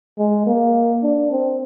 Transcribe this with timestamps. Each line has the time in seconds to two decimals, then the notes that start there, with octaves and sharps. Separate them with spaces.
0.18 G#3
0.46 A#3
1.03 D4
1.31 C4